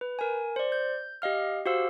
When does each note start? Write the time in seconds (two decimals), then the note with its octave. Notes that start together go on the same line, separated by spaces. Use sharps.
0.01 B4
0.19 A#4 G#5
0.56 C5 D5
0.72 G6
1.22 G4 D#5 F5 F6
1.66 F#4 G4 C5 F5 E6